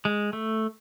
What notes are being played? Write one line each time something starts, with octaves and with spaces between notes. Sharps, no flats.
G#3
A3